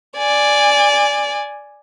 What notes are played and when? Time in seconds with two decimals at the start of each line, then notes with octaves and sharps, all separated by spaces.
0.18 D5 G#5